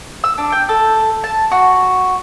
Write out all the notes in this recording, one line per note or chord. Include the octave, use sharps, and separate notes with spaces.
E6
D4
G5
A4
A5
F#4